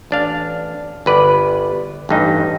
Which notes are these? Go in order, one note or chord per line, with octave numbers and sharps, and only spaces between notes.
A1 D4 F5
G1 B4 D5
A1 G2 D#4